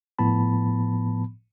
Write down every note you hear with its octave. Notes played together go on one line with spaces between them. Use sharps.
G1 A2 F3 B3 A5 B5